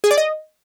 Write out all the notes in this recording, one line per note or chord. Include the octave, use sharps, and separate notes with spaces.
G#4
D5
D#5